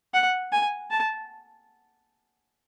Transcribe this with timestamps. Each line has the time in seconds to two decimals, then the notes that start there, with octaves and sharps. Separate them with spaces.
0.14 F#5
0.52 G#5
0.91 A5